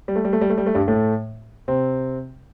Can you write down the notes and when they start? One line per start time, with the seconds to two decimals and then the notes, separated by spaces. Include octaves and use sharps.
0.08 G3
0.16 A3
0.25 G3
0.33 A3
0.41 G3
0.50 A3
0.58 G3
0.66 A3
0.74 G2 G3
0.88 A2 A3
1.68 C3 C4